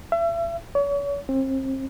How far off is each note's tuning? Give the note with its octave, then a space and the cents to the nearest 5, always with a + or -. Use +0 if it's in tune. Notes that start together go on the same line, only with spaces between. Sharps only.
E5 +35
C#5 +40
C4 +35